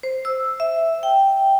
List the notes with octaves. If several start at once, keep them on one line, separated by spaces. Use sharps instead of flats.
C5
E6
E5
G5